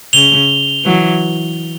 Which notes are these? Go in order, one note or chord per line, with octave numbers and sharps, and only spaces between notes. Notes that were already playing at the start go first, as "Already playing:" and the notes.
C#3 F7 G7
E3 F#3